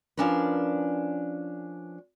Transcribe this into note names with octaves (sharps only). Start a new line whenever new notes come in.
F3 A#3 C#4 D4 A#4 B4